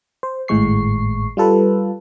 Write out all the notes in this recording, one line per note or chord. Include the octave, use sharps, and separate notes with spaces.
C5
G#1 A2 G#3 C#6 C7
G3 F4 A4 B4